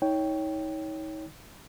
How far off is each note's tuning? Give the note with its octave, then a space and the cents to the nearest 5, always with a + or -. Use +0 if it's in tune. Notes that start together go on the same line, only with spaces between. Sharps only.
D#4 +35 C#5 +10 G5 +0